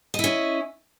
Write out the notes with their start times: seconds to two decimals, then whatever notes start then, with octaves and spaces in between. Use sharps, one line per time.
0.14 D#5
0.19 E4
0.24 C#4